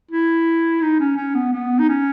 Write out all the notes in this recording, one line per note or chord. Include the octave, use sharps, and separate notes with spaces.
E4
D#4
C#4
C#4
B3
B3
D#4
C#4